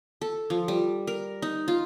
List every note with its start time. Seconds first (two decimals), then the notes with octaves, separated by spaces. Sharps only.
0.21 A4
0.50 F3
0.68 G3
1.07 A#4
1.42 D#4
1.68 F4